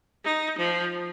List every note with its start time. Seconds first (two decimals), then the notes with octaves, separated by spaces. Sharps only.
0.24 D#4
0.58 F3